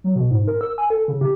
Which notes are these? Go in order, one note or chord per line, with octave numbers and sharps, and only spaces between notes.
F#3
B2
G#2
A#4
E6
G#5
A4
C#3
G4